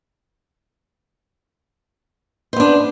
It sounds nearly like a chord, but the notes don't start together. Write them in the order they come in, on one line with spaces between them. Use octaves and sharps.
C5 B3 D4